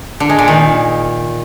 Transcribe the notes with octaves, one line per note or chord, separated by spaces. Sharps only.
D3
G#3
A#2
D#3